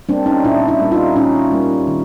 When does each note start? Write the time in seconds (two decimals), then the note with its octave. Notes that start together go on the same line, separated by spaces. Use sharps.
0.09 G3 A#3 C4 D4
0.26 C#4 D#4
0.44 A#2 D4 E4
0.68 D4 E4
0.80 G3 A#3
0.92 D#4 F4
1.16 A#2 C#4 D#4
1.52 G3 A#3
1.88 D#3